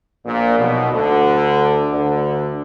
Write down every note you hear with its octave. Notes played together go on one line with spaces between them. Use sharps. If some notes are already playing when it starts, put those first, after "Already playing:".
A#1 A#2
B1 B2
D2 D3
D2 D3